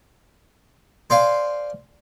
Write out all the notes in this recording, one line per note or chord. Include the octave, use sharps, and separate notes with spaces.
C5 D5 F5 G#5